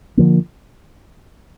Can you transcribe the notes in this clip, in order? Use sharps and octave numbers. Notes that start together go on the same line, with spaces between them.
D3 F3 A#3